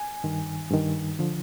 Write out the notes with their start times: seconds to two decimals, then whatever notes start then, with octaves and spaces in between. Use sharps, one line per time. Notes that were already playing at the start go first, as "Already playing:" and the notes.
Already playing: G#5
0.24 G2 D#3
0.71 G2 D#3
1.19 D3 F3